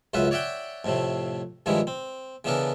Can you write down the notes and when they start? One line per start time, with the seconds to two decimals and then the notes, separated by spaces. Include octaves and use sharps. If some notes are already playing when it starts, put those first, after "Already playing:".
0.14 C#2 F#2 F4 B4 E5 F#5
0.31 C#5 D5 E5 F#5 G5
0.85 F2 A2 C3 A3
1.66 G2 D#3 F3 G3 G#3 E4
1.87 C4
2.44 C#3 E3 B3 D4 A4 A#4